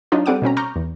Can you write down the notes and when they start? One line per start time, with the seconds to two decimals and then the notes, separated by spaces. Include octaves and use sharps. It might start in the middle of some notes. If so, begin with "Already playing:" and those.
0.12 F#3 D4 D#4 F4
0.26 G3 C4 A4 F#5 D6 D#7
0.42 B2 C4 C#4 A#5
0.57 A#5 C#6 D6 F6 G6 A#6
0.76 E2